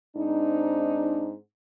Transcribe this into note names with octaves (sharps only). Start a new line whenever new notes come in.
G#2 C4 D4 D#4